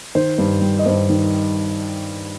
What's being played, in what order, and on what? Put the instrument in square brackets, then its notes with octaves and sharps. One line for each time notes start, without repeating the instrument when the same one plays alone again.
[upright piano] D#3 C5
G2
G3
D#5
G2 C5
D#3